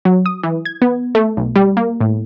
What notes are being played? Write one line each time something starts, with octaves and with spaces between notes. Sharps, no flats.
F#3
D#6
E3
G#6
B3
A3
B1
G3
A#3
A2